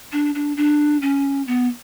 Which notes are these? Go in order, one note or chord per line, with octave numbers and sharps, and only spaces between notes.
D4
D4
D4
C#4
B3